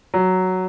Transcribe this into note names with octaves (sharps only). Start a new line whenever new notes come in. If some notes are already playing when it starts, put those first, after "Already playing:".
F#3